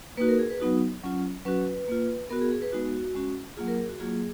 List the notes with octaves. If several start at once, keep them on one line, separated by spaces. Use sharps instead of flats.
A#3 D#4 F#4 B4
A#4
G#4
B4
F#3 B3 D#4 F#4
F#3 C#4 F4
F#3 C#4 F#4 B4
A#3 F4
B3 F#4 A#4
G#4
G#4
B4
G#3 B3 D#4 F#4
G#3 C#4 F#4
F#3 A#3 F4 G#4
A#4
G#4
F#4
F#3 A#3 F4 G#4